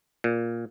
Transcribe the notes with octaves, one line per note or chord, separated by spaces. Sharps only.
A#2